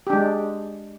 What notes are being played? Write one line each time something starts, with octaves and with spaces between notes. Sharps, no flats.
G#3 D4 G4